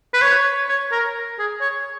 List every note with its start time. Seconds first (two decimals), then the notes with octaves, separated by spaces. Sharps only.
0.14 B4
0.22 C#5
0.69 C#5
0.92 A#4
1.39 G#4
1.61 C#5